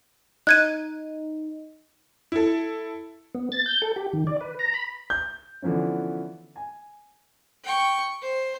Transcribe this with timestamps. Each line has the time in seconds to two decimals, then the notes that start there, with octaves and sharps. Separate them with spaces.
0.47 D#4 F#6 G#6 D#7
2.32 E4 A4
3.35 B3
3.52 A6
3.66 G6
3.82 A4
3.96 G4
4.13 D#3
4.27 D5
4.41 B4
4.59 A#5
4.74 B5
5.10 G6
5.62 D3 E3 F3 B3 C#4
6.56 G#5
7.64 G5 C#6
8.22 C5